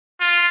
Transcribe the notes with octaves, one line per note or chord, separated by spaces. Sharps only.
F4